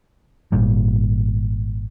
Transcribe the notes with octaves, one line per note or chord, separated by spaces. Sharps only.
G#1 A#2 G3